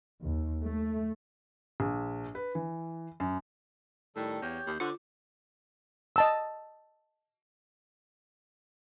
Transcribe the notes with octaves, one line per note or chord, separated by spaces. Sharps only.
D#2
A3
A#1
B4
E3
F#2
A2 D#3 G3 A4
E2 G4 C#5 G6
D#2
D3 F4 C5 F#5 C#6 D6
D#5 A5 E6